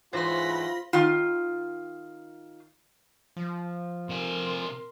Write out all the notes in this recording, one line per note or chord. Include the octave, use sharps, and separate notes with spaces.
G#2 E3 F#3 F4 C5 B5 C6 A#6
D#3 F4
F3
C3 A#4 G#5 C6